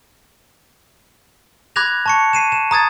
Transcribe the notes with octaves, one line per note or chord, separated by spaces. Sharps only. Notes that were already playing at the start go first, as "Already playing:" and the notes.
B5 D6 F#6 G#6 A#6 F7
A5 C#6 C#7
C7 D#7 E7
E7
A#5 D#6 G#6 A6